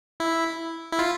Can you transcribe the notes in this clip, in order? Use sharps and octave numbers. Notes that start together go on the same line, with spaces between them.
E4
E4
F4